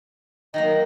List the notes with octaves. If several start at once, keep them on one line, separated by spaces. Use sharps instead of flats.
D#3 F#3 A#3 D#5